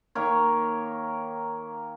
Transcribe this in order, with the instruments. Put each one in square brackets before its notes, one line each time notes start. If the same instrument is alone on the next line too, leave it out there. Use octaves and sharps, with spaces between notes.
[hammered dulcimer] D#3 A#3 A#4 C#5